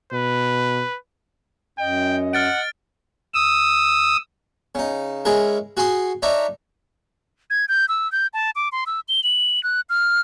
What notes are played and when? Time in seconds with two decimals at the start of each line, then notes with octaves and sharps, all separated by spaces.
0.13 B2 B4
1.79 F#2 D#5 G5
2.33 F#5 F6 A6 D7
3.34 D#6 E6
4.75 C#3 D#4
5.25 G#3 C#4 E4 G#4 A#4
5.77 F#4 G#4 G#5 C6 D#6
6.22 D4 D#4 C#5 E5 A#5
7.50 G#6
7.69 G6
7.89 E6
8.12 G6
8.34 A5
8.56 D6
8.72 C6
8.87 E6
9.08 G7
9.24 F#7
9.63 F#6
9.90 F6